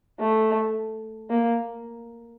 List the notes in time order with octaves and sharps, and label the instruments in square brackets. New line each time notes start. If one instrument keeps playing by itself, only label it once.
[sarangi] A3
A#3